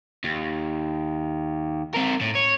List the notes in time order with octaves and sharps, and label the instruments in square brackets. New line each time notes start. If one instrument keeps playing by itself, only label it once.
[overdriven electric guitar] D#2
C4 A#4
A2
C#5